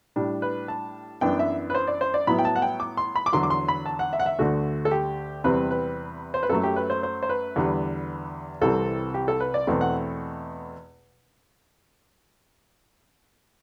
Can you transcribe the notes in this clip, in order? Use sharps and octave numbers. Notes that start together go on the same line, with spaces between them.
A2 G3 D4
B4
A5
F#2 E3 B3 D4 G5
E5
B4
C5
D5
C5
D5
A2 F#3 B3 E4 B5
G5
A5
F#5
G5
D6
C6
B5
D6
E2 D3 F#3 C6
D6
C6
B5
A5
F#5
E5
F#5
E5
D2 D3 A3 F#4
A4
G4
E2 C3 G3 C4 B4
B4
C5
B4
F#2 F#3 A3 A4
G4
B4
C5
C5
C5
B4
E2 D3 G3
C2 C3 E3 G3 C4 A4
G4
A4
B4
D5
E2 B2 A3 C4
F#5